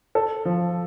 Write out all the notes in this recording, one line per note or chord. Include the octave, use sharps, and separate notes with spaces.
A4
F3